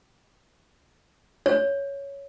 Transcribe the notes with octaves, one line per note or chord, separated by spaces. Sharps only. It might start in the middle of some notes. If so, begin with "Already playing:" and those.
C#5